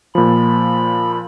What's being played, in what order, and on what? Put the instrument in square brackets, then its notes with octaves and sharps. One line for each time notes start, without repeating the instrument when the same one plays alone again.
[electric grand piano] A#2 F3 [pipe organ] B5